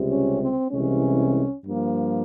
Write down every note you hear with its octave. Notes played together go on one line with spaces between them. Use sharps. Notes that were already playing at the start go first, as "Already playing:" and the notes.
Already playing: C#2 C3 G3
C#4
C4
C2 C3 E3 G#3 C#4
G2 F3 A#3